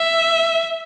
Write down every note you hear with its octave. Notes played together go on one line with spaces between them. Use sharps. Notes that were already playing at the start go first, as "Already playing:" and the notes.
Already playing: E5